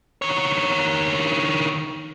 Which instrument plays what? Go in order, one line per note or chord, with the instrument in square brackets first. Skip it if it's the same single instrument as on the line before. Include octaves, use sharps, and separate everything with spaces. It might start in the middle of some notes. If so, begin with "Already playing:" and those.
[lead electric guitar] D#3 C#5